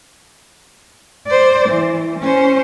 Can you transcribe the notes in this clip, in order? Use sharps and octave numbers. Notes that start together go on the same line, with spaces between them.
C5 D5
E3
C#4 C5